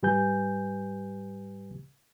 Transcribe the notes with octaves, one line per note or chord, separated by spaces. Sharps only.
G#2 G3 G4 B4 G#5 G6